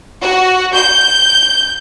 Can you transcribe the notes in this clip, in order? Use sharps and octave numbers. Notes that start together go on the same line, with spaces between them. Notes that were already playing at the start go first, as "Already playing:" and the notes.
F#4
G6